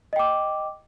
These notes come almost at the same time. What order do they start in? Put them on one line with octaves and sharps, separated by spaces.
D#5 G5 D6